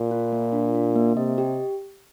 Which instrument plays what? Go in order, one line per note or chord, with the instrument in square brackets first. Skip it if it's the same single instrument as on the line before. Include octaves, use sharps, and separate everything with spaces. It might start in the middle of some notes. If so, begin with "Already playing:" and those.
Already playing: [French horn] A#2
[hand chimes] F4
A#3
D4
D4
A#3
[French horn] C3 [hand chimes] D#5
[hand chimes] G4